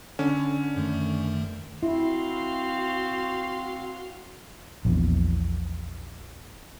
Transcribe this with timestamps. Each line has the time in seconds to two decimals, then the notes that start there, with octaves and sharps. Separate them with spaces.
0.19 D3 C#4
0.77 F#2 D#3 A3
1.83 C4 E4 F#4 F5 C6
4.85 A#1 E2